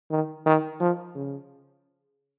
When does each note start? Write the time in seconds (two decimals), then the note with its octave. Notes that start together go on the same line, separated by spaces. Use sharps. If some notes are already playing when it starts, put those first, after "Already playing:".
0.10 D#3
0.46 D#3
0.80 F3
1.15 C#3